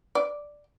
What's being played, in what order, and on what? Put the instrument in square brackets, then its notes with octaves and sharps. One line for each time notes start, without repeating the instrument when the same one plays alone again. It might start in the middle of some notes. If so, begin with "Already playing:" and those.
[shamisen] D5